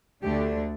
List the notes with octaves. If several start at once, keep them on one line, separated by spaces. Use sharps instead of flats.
D2 D3 A3 D4 G4